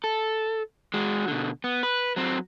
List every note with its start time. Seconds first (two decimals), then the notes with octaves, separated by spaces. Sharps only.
0.04 A4
0.94 G#3 F#4
1.28 B2 D3
1.64 B3
1.83 B4
2.16 F#3 C4